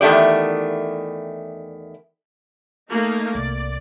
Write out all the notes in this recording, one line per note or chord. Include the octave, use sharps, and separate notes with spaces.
E2 D#3 A3 G4 D5
A3 A#3 D#4
C2 D5